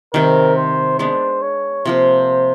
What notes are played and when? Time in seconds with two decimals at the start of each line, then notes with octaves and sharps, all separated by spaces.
0.13 C3 D#3 G3 A#4
0.56 C5
0.99 G#3 B3 D4 C5
1.42 C#5
1.85 C3 F3 A#3 C5